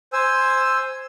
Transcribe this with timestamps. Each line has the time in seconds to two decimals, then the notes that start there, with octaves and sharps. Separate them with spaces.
0.13 C5 G#5 E6